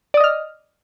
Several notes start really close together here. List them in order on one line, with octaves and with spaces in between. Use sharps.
D5 D#6 D#5 F6